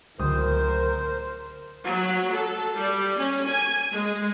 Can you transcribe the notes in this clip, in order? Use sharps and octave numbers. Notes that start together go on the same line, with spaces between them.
D1 C#2 D3 E3 A#4 C5 D#6
F#3
A4
G3
C#4
G#5
G#3